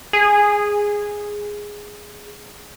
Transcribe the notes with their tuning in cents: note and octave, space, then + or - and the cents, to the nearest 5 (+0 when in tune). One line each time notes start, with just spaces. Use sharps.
G#4 -5